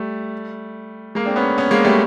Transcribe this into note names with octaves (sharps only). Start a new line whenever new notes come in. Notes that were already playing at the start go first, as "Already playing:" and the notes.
Already playing: G3 A3
G#3 A#3
C4 D4
B3 C#4
B3 C#4
G#3 A#3
G3 A3